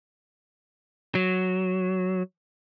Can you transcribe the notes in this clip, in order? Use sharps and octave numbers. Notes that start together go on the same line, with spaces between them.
F#3